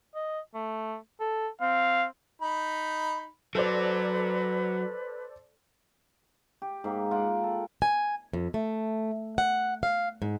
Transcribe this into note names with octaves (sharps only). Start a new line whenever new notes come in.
D#5
A3
A4
C4 F5
D#4 B5
F#3 A4 B4 C5 D5
G4
G#2 A#3 G4
F4 F#5 G5
A4
G#5
F2
A3
F#5
F5
G#2